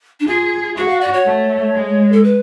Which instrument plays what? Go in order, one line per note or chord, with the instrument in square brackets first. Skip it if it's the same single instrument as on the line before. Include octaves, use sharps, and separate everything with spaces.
[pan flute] D4
[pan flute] F4 [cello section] G#4
[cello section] F#4 [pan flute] G#4
[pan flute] F5
D5
C#5
[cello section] A3
G#3
[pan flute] A4
B4